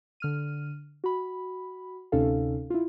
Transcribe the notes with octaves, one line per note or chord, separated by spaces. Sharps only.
D3 F6 D#7
F#4 B5
D2 C3 C#4 D#4 A4 F5
E4 F4